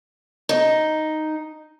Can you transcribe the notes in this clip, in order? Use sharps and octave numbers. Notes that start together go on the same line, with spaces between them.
D#4